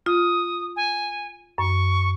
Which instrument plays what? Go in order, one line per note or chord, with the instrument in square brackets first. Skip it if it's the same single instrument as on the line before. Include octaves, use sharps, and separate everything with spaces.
[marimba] F4 [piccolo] D#6
[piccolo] G#5
[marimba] F#2 [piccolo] C#6